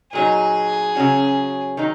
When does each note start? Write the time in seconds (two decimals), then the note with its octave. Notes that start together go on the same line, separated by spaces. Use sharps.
0.13 A#2 F#3 D#4 G#4
0.95 C#3 F#3 C#4 F#4
1.77 D#3 F#3 D#4